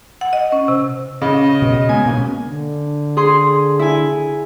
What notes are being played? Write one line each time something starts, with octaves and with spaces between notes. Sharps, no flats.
F#5
D#5
C#4
C3
C#3 D#5
B2
G#3 B3 G#5
B2 A#3 C#4
D3
G#4 C6
E4 G#5